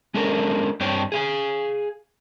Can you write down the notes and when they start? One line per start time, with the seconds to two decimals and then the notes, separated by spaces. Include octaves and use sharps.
0.14 G#3 C#4 D4 A4 A#4
0.80 G2 C4 D4 C5 C#5 G5
1.12 G#4 F5 G#5